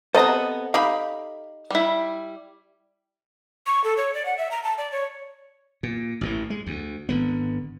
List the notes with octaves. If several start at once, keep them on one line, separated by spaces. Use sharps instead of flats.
C3 B3 A4 C5 D#5 A#5
D#4 G4 F5 B5
G3 E4
C#6
A4
C#5
D5
F#5
E5
A#5
A5
D5
C#5
A#2
A1 A2 E3
G#3
D2
G#1 D3 B3